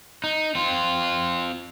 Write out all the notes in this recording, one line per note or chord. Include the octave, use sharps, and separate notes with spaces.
D#4
C4 F4